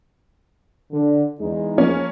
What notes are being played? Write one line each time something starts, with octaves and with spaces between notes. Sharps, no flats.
D3
E2 G#3 D#4
F3 A#3 C#4